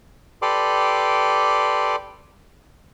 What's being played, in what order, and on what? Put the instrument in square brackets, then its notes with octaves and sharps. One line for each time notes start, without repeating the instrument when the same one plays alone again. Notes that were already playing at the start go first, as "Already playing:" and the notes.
[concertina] G4 A4 B4 D5 C6 D6